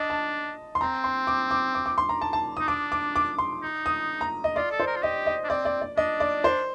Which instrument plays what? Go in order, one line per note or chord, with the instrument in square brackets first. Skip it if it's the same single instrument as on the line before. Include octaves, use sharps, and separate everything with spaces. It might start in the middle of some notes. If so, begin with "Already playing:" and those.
Already playing: [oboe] D4 [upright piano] D#5
[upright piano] A5
C6
[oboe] C4 [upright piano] A#5
[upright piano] C6
D6
D6
D6
D6
C6
A#5
A5
A5
[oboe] D#4 [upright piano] D#6
[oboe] D4 [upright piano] D6
[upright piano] D6
D6
C6
[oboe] D#4
[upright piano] D#6
A#5
D#5
[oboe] F4 [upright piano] D5
[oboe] A4
[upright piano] C5
[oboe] A#4
F4
[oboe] G4 [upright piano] D#5
[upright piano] D#5
[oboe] D4
[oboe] C4 [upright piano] D5
[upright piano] D5
D5
[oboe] D4 [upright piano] D#5
[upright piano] D5
C5